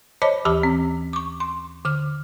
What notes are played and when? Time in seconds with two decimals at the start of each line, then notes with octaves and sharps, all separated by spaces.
0.22 C5 C#5 D#5 A5 B5 D6
0.45 D#2 E3 G4 A5 B5 D6
0.63 C4
1.13 C#6 D6
1.40 C6
1.85 D3 F6